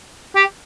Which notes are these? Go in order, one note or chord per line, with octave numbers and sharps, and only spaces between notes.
G4